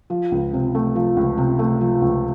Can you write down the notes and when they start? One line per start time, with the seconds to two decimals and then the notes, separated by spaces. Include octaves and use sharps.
0.10 F3
0.32 C#2
0.53 C3
0.75 A3
0.96 F3
1.17 C#2
1.38 C3
1.59 A3
1.81 F3
2.02 C#2